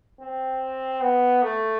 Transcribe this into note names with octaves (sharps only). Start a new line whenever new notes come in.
C4
B3
A3